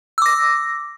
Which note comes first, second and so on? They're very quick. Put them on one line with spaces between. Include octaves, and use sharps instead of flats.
E6 D6 A#6